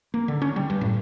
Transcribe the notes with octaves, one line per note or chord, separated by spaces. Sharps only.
A#3
D3
C#4
G3
G2
A2